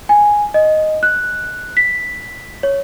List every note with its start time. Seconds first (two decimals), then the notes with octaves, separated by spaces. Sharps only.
0.09 G#5
0.54 D#5
1.03 F#6
1.77 B6
2.63 C#5